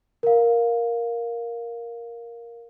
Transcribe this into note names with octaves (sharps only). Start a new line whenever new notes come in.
A#4 F5